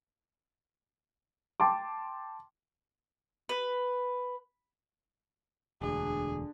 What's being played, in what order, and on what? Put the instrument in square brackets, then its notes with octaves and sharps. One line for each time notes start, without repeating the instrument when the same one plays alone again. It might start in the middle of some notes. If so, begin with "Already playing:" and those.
[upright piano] G5 A5 C6 D6
[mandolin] B4
[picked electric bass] E1 D2 [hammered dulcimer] D3 D4 [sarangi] G#4